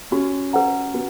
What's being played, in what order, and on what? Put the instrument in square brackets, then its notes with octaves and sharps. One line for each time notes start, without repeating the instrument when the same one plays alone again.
[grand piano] C#4 [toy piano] F#4
[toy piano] B4 F#5 A#5
[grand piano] B3 [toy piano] F#4